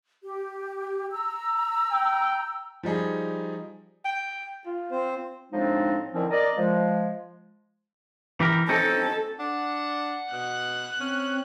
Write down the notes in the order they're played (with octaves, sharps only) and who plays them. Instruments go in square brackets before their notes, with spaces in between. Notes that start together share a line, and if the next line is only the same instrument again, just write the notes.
[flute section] G4
A#5 E6
[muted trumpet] G5
[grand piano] F3 G3 D#4 G#4
[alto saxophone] G5
F4
[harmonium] C4 C5
[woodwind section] A2 F3 G#3 C4 D4 D#4
D3 D#3 F3 C4 C#4 E4
A#4 D5 D#5
F3 G#3
[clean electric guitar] E3 G4 A#4
[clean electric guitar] C4 C#4 D#4 [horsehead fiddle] A4
[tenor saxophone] D4 [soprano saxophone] F#5
[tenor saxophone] B2 [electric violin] F#6
[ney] C4 [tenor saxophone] C#4